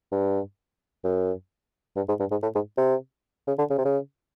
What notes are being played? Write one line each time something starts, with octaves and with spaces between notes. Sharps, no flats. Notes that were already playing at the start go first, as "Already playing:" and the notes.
G2
F#2
G2
G#2
G2
G#2
A2
G#2
C3
C#3
D3
C#3
C3
C#3